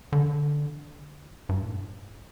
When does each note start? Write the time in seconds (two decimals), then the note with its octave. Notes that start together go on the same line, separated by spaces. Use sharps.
0.12 D3
1.49 G2
1.63 A2